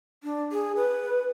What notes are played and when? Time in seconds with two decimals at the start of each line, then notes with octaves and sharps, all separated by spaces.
0.23 D4
0.52 G#4
0.76 B4